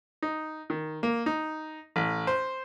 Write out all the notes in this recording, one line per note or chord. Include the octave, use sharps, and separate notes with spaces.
D#4
D#3
A#3
D#4
A1
C5